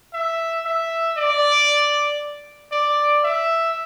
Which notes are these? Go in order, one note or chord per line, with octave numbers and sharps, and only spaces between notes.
E5
E5
D5
D5
E5